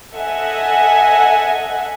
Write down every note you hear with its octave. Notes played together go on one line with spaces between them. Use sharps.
A4 D#5 E5 F#5 G#5